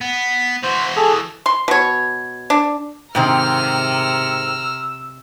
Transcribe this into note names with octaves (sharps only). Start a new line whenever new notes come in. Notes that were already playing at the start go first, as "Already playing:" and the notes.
B3
E3 F#4 C5
G#4 A4
C6
B2 C#5
D4
G#2 C3 D#3 C4 A#5 E6 F6